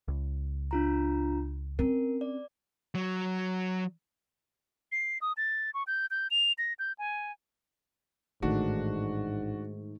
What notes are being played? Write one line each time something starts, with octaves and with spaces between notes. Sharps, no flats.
C#2
D4 F4 A#5
C4 C#4 A#4
D5
F#3
C7
D#6
A6
C#6
G6
G6
F7
A#6
G6
G#5
A1 G#2 D#3 A3 D4 F#4